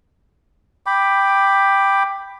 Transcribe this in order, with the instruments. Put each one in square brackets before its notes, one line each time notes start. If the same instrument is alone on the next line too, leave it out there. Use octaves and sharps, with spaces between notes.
[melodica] G5 B5 D6